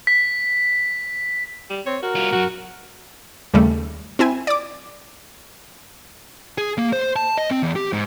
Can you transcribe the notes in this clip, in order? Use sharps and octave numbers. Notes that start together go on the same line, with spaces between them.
B6
G3
C4 C#5
F#4 A#4
G3 F4
C2 F#2 F#4
D#2 C#3 G3 A3
C4 E4 G#5
D5 D6
G#4
A#3
C5
A5
D#5
C4
E2
G4
G#2